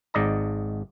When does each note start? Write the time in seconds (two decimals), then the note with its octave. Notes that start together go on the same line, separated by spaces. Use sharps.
0.14 G#1 G#2 D5 D#5 A#5